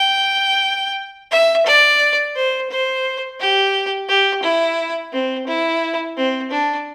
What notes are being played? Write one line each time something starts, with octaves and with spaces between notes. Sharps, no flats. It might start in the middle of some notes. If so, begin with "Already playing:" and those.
Already playing: G5
E5
D5
C5
C5
G4
G4
E4
C4
E4
C4
D4